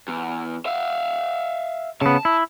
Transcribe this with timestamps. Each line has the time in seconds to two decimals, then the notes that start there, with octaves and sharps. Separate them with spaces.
0.08 E2
0.66 E5 F5
2.01 C#3 B3 A5
2.25 E4